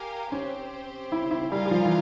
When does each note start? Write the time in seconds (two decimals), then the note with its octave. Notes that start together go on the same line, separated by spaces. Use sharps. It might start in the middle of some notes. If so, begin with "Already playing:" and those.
Already playing: G4 A#4 F5 G#5
0.32 C4 C#4 G4 C5
1.12 E4
1.31 E4
1.51 G3 F4 A#4 F5 G#5
1.66 G3
1.71 F3
1.85 E3